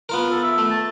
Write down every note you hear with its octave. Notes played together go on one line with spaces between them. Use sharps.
B3 F4 A#4
A4
E5
A3
A5